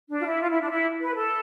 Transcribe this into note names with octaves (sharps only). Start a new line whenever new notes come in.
D4
F4
E4
F4
E4
D4
E4
B4
A4